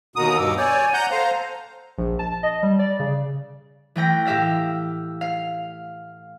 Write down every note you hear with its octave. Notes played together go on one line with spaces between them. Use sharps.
D#2 B2 A#4 F#5 A#5 D#6
G2 B2 D6 E6
C#5 D5 G#5 G6
F#5 A#5 G6
A4 C5 F5 A#5
A#1
A5
D#5
G3
D5
C#3
E3 A3 G5 A#6
A2 G4 E5 F5 A#6
F5